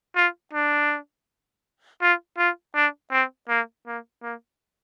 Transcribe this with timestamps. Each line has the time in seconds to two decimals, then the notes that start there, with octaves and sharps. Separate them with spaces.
0.16 F4
0.53 D4
2.02 F4
2.38 F4
2.75 D4
3.12 C4
3.49 A#3
3.87 A#3
4.23 A#3